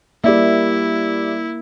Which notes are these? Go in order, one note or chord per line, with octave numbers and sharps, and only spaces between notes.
G3 A#3 E4 D5 E5